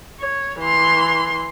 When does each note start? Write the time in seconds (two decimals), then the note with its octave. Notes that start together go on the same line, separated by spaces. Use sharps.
0.20 C#5
0.60 E3 C6